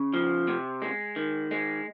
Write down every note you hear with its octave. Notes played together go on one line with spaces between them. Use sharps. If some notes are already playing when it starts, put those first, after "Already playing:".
Already playing: C#3
F3
C3
G#3
D#3
G#3